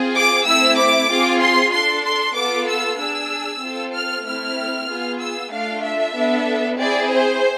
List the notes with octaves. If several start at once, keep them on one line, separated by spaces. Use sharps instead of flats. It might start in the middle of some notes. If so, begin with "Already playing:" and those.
Already playing: C4 F4 G#4
D6
A3 C4 E4 E6
D6
C4 F4 G#4
C6
D4 A4 C6
C6
B3 F4 A4 D6
E6
D4 G#4 E6
C4 F4 A4
F6
A3 C4 E4 F6
B3 F4 G#4
E6
A3 D4 F4 F5
E5
B3 D4 A4
C4 E4 G#4 D5
C5